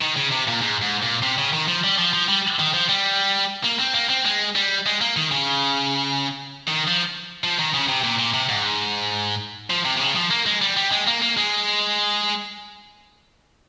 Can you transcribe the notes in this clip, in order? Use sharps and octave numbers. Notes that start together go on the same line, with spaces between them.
D#3
C#3
C3
A#2
G#2
G#2
A#2
C3
C#3
D#3
F3
G3
F3
F3
G3
D#3
F3
G3
A#3
C4
A#3
C4
G#3
G3
G#3
A#3
D#3
C#3
D#3
F3
F3
D#3
C#3
C3
A#2
A#2
C3
G#2
F3
C3
C3
C#3
F3
A#3
G#3
G3
G3
G#3
A#3
A#3
G#3